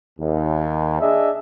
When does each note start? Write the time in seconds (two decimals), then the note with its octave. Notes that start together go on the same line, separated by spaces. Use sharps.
0.19 D#2
1.00 D4 G#4 D#5 E5